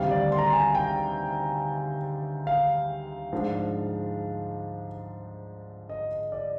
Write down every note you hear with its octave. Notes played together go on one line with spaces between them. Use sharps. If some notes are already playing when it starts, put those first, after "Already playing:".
Already playing: D2 C3 D#3 G3 F5
D5
C6
A#5
C6
G#5
G5
F5
G#2 F3 G#3 D4
D#5
D5